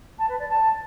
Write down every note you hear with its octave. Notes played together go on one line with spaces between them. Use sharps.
A5
B4
D5
A5